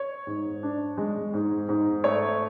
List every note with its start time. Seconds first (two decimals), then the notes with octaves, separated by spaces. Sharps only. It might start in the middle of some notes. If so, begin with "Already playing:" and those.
Already playing: C#5
0.27 G#2
0.63 D4
0.98 G#3
1.33 G#2
1.69 G#2
2.04 A3 C#5